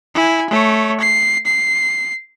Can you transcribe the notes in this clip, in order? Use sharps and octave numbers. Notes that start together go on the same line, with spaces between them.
E4 G#5
A3 C#5
C7
C7